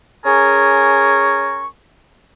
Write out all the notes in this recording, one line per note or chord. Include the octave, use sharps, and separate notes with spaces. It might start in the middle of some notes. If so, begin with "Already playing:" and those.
C#4 G#4 A#4 G#5 C#6